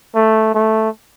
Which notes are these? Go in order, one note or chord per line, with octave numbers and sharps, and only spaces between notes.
A3
A3